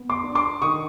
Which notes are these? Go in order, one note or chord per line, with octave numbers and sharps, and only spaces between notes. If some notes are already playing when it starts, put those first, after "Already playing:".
Already playing: B3
C6 D6
D4
C6 D6
D#3 C#6 D#6